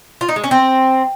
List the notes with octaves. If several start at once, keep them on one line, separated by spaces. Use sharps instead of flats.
F4
D#4
G#3
C#4
C4